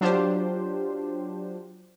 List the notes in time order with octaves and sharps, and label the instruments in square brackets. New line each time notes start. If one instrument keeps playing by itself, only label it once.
[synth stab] F#3 D4 F4 G4 C5